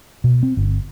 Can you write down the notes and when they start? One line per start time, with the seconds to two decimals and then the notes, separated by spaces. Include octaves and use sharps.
0.24 B2
0.43 C4
0.57 G1